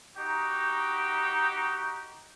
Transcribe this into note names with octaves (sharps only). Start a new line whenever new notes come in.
D#4 F#4 G4